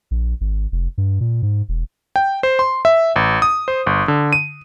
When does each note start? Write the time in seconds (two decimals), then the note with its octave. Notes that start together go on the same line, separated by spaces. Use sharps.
0.11 A#1
0.41 G#1
0.72 F1
0.98 G2
1.21 A#2
1.43 G#2
1.69 E1
2.16 G5
2.43 C5
2.59 C6
2.85 E5
3.16 A1
3.42 D#6
3.68 C5
3.86 G1
4.08 D3
4.33 D#7